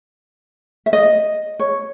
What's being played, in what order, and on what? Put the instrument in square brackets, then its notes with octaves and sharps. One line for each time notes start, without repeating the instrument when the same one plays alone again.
[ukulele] E5
D#5
C#5